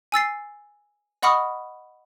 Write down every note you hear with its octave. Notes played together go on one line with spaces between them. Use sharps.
G#5 E6 A6 C7
D#5 F#5 B5 C#6 D#6 F6